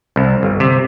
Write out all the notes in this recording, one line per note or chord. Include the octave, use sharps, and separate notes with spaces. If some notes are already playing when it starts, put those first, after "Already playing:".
C2
G1
C3